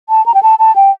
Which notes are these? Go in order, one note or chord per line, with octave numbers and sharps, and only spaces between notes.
A5
A#5
G5
A5
A5
G5